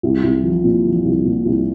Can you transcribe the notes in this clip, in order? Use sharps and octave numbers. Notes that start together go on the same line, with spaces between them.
C2
C2
F3
A#2
F3
C2
A#2
C2